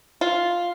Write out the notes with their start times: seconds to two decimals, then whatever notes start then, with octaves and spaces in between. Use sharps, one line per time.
0.21 F4